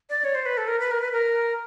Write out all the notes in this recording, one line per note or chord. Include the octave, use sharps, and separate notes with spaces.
D5
C#5
C5
B4
A4
A#4
B4
A#4
B4
A#4